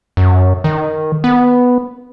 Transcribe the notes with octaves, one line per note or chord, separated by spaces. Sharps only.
F#2
D#3
B3